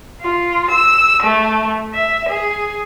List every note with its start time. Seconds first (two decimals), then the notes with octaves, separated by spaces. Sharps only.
0.20 F4
0.69 E6
1.23 A3
1.94 E5
2.28 G#4